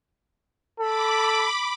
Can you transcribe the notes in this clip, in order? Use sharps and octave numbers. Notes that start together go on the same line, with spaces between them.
A4 B5 D6